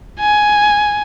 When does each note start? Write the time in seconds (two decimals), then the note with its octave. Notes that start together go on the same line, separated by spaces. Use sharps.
0.20 G#5